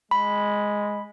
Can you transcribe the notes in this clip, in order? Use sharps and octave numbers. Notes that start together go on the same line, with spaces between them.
G#3 B5